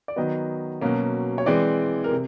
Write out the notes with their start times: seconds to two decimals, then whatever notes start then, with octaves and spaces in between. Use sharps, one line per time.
0.08 D5
0.16 D#3 F#3 B3 D#5
0.81 B2 F#3 A#3 C#4
1.38 C#5
1.46 E3 G#3 C4 D5
2.04 A#4
2.11 C3